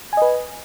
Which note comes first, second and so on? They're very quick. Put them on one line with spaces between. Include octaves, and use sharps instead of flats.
G#5 D#5 B4